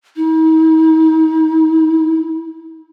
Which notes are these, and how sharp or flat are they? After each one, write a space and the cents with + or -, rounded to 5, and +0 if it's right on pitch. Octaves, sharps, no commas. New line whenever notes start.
D#4 +45